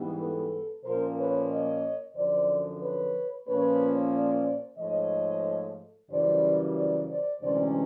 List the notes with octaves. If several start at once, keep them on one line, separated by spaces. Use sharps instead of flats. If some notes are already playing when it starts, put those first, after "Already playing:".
Already playing: G#2 E3 G3 B3
A4 B4
A#2 F3 A#3 C#4 A#4 C5
B4 C#5
C#5 D#5
F#2 D3 F3 C5 D5
B4 C#5
A#2 F3 A#3 C#4 B4 C#5
C5 D5
G#2 F3 A3 C#5 D#5
F#2 C#3 E3 G3 C5 D5
C5 D5
C5 D5
D2 C3 E3 G#3 C#4 C5 D5